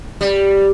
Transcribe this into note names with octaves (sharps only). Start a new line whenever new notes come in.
G3